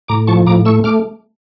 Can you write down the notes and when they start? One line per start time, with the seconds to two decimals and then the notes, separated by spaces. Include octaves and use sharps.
0.08 A2 A#5 D6
0.27 F3 A5 C#6
0.47 A2 A#5 D6
0.65 A3 C#6 E6
0.84 A3 D6 F6